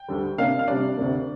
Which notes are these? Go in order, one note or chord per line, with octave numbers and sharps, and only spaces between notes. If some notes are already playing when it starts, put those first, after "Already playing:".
Already playing: G5
D2 D3 G3
C3 A#3 D4 F5
F5
C3 G3 D4 D5
D2 C3 A#3